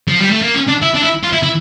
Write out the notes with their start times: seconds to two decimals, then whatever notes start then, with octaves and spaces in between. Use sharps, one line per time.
0.08 F3
0.20 G3
0.31 A3
0.42 A#3
0.54 C#4
0.68 D4
0.82 E4
0.94 D4
1.02 E4
1.23 F4
1.33 E4
1.43 E4